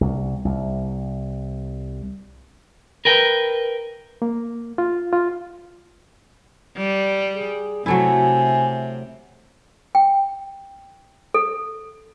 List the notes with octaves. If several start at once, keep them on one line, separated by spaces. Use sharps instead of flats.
C2
C2
A#4 B4 G5
A#3
F4
F4
G3
G#4
C3 F#3 A3 E4 G#5
G5
A4